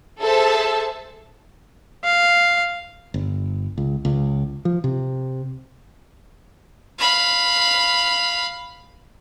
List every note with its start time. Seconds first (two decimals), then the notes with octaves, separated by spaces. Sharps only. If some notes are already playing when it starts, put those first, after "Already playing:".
0.20 G#4 A4 C5 E5 A5
2.04 F5
3.14 G1
3.78 C#2
4.05 C#2
4.65 F3
4.84 C3
6.99 F5 B5